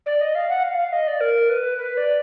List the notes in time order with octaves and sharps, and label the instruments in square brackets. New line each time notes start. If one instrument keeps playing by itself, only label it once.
[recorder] D5
D#5
F5
F#5
F5
F5
D#5
D5
A#4
B4
B4
D5